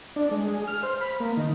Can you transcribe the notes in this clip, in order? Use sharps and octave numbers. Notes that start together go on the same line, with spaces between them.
D4
G#3
G#4
F6
C5
B5
A#3
D#3